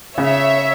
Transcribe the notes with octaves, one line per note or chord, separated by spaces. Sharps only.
C#3 C#5 E5